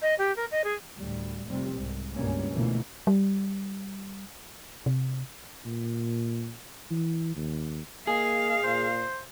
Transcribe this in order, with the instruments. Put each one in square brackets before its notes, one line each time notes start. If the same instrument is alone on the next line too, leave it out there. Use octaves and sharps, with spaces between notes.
[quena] D#5
G4
A#4
D#5
G#4
[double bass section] D2 A2 G3
F1 C3 G3 C4
C2 G#2
C#2 G2 B2 G3 A#3 C#4
B2 D3 E3 F3 A3 A#3
[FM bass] G3
C3
[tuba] A#2
E3
D#2
[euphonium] A#3 [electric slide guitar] G#4 [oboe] D#5 [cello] F5
[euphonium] A#2 [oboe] C5